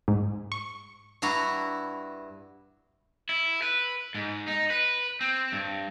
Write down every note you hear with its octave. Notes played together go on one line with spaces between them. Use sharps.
G#2
C#6
G2 E4 F#4 A#5
E4
B4
G#2
D#4
B4
C4
G2